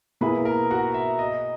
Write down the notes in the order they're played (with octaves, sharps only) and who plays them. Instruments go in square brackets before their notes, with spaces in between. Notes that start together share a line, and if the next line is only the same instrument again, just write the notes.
[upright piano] B2 A#3 E4 G#4 [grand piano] B4 B5
[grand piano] A#4 A#5
F#4 F#5
E5
D#5